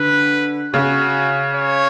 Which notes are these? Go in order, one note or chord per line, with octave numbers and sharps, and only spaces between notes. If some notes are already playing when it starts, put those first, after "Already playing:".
Already playing: D3 B4
C#3 F#4
C#5